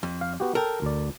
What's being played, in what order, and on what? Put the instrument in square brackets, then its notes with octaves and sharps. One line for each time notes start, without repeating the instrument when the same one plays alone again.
[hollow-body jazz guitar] F2
[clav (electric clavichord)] F5
B3 F#4 G4
[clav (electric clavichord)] A4 G5 [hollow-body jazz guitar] A#4
[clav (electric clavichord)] D2 D5